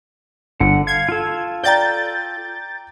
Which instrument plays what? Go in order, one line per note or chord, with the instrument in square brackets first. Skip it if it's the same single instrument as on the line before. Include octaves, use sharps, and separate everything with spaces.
[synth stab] G1 [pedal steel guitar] D3 F#5
[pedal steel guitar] F5 [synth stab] G#6
[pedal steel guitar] F4 A4
[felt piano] D5 G5 A#5 [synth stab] G6 A6